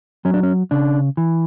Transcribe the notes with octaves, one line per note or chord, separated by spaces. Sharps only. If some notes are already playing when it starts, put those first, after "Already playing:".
F#3 C#4
D4
C#4
C#3 D4
E3